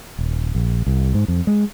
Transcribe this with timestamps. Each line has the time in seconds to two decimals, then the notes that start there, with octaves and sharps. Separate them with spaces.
0.18 D#1
0.55 A#1
0.87 C2
1.14 G#2
1.28 F2
1.47 G#3